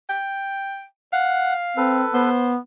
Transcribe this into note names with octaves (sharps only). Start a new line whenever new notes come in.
G5
F5 F#5
C4 A4 B4
B3 C5